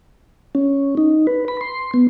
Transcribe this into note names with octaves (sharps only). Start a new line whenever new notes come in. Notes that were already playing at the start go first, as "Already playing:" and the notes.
C#4
D#4
B4
B5
C6
B3